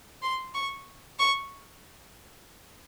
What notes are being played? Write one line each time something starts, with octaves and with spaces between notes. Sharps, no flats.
C6
C#6
C#6